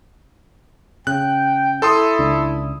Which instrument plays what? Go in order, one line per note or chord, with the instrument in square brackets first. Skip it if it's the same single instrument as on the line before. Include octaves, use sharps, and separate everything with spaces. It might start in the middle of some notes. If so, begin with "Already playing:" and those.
[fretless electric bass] C#3 [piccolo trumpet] G5 [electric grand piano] F#6
[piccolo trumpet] E4 [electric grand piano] A4 C6 D#6
[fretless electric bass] C#2 D4